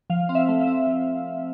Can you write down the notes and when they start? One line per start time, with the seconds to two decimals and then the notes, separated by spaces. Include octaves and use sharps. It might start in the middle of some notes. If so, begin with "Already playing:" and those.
0.10 F3 F5
0.29 C4 F5
0.35 E5
0.48 A3
0.61 E5
0.67 C4
0.87 F3